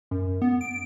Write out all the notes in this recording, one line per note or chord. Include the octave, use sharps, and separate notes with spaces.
F#2
B3
D7